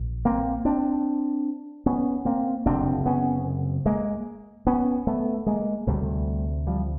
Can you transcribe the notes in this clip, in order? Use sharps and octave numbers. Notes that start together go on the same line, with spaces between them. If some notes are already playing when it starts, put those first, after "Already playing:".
Already playing: A#1
A#3 C4
C4 D4
B3 C#4
A#3 C4
F#1 F2 C3 C4 D4
B3 C#4
G#3 A#3
B3 C#4
A3 B3
G#3 A#3
D2 C3 G3 A3
F3 G3